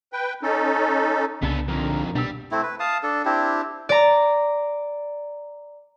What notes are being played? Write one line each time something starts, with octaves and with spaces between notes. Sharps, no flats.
B4 G5
C#4 D#4 A4
C2 C#3 B3 D4 A4 A5
F2 D3 D#3 A#4
B2 G3 D4 E6
A3 C4 E4
B4
F5 A5 D#6
D4 A4
C4 D4 E4 G4
D5 A#5